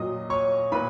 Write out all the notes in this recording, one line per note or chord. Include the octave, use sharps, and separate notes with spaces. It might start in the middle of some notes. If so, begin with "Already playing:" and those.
Already playing: A#2 F#3 D#5 D#6
C#5 C#6
A#2 B4 B5